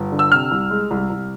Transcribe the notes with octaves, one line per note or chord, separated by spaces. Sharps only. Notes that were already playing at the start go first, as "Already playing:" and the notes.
Already playing: G1
D3
E6
C3 F6
C2
G#3
C2
C2